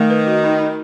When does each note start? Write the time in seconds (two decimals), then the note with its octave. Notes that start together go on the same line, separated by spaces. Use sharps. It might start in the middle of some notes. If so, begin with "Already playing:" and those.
Already playing: D#3 A3
0.10 B4
0.27 F#4
0.44 D#4
0.60 D#4